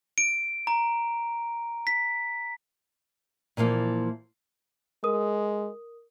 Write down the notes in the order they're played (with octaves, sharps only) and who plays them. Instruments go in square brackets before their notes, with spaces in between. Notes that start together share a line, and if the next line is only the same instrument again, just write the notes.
[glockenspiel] D7
A#5
B6
[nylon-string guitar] A#2 E3 F3 A#3
[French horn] G#3 [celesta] A#4 D#6